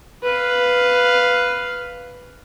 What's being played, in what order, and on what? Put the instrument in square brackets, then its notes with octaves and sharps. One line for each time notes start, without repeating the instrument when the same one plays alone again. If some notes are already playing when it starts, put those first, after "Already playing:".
[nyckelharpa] B4 F5